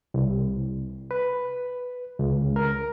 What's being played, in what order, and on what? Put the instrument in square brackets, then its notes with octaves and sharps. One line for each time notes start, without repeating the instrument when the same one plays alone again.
[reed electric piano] C2
B4
C#2
A#4